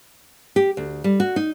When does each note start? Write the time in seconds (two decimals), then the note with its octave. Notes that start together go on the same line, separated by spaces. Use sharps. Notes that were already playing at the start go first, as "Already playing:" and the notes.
0.56 G4
0.77 D2
1.04 G3
1.20 F#4
1.36 D#4